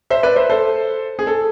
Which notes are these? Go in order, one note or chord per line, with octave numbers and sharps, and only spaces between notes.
C5 E5
B4 D5
C5 E5
A4 C5
G#4
A4